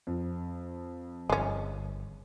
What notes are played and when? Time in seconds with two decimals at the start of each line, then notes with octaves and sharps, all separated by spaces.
0.07 F2
1.30 G1 G#3 C#4